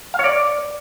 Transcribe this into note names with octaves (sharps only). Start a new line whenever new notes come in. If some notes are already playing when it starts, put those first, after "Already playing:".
F5
C#5
D5